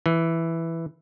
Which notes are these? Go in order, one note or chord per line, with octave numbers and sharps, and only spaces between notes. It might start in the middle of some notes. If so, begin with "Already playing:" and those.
E3